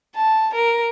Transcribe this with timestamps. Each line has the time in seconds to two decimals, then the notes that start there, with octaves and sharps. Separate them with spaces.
0.16 A5
0.54 A#4